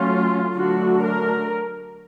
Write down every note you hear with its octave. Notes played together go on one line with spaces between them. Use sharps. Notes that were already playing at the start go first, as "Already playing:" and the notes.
Already playing: F#3 A3 C#4 F4
D3 F#3 A3 D4 F#4
A#4